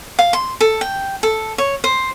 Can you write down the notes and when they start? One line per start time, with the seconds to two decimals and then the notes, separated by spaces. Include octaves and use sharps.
0.19 F5
0.33 C6
0.61 A4
0.81 G5
1.23 A4
1.58 C#5
1.84 C5